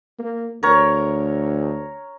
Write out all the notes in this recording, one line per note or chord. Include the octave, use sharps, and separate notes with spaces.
A#3
D2 A#4 C#5